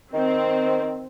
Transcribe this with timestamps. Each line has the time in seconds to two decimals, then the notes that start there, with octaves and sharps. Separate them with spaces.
0.14 D#3 C4